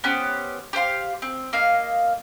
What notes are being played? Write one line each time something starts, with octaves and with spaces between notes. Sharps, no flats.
B3 C#4 G4 C5
G4 C5 F5 C6
C4
A#3 D#5 F5